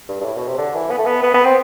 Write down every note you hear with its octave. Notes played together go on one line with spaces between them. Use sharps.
G2
G2
A2
B2
C3
D3
E3
B3
A3
B3
B3
B3
C4